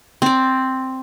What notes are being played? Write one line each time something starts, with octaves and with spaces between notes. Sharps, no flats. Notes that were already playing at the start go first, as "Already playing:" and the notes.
C4 D5